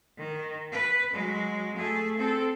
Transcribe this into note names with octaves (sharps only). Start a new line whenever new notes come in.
D#3
B4
F#3 G#3
A3 G#4
C4 A4